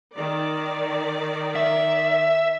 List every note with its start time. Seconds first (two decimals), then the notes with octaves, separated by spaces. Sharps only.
0.14 D#3 D5
1.56 E5